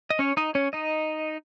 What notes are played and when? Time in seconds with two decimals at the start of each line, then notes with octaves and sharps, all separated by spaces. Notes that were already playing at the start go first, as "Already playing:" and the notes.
0.10 D#5
0.19 C#4 C#5
0.37 D#4 D#5
0.55 C#4 C#5
0.73 D#4 D#5